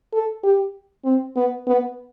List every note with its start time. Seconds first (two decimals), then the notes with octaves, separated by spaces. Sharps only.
0.13 A4
0.43 G4
1.05 C4
1.36 B3
1.67 B3